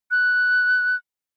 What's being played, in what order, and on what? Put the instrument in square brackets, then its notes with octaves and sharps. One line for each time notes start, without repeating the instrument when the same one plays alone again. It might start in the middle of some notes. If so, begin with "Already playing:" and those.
[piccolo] F#6